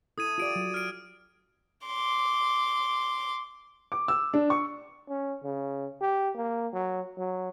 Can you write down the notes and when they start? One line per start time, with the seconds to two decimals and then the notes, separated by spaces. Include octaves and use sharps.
0.18 E4 A4 D#6 G#6 D#7
0.38 F4 G4 D5 D7 D#7
0.56 F#3
0.74 F6 D7
1.86 C6 D6
3.92 D6
4.08 E6
4.34 D4
4.50 C#6
5.09 C#4
5.44 C#3
6.01 G4
6.35 A#3
6.73 F#3
7.18 F#3